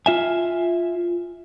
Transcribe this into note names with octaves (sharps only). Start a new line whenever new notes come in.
F4 E5 G#5